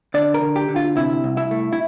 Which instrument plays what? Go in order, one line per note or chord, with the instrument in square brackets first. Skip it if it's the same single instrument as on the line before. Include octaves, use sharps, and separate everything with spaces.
[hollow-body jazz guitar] D3 D5
A#4
D3
G4
D3
F4
C3 E4
C2
E4
A3
E4